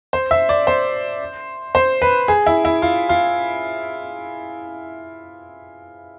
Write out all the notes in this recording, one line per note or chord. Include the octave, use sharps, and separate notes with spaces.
C5
E5
D5
C5
C5
B4
G#4
E4
E4
F4
F4